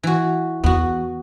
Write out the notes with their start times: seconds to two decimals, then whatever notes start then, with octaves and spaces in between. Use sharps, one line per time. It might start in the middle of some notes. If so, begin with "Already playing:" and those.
0.03 E3 F#4
0.64 E2 B3 F#4